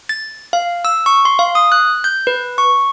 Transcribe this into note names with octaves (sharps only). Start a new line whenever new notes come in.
A6
F5
E6
C#6
C6
F5
D#6
F#6
G6
B4
C#6